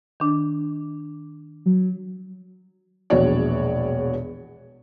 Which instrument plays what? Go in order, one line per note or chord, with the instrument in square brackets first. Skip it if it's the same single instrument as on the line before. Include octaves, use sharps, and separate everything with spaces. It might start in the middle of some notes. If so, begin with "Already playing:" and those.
[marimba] D#3 D4
[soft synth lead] F#3
[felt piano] E1 A#1 E2 F#4 C#5 D5